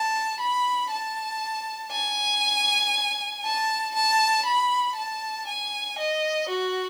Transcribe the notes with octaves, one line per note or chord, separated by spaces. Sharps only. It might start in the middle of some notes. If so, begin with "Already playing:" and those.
Already playing: A5
B5
A5
G#5
A5
A5
B5
A5
G#5
D#5
F#4